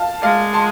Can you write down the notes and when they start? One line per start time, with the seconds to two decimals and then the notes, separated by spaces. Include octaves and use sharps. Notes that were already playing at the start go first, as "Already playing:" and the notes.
Already playing: F5 A5
0.22 G#3 D5 F5
0.54 A5 C6